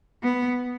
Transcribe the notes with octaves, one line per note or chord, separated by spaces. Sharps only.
B3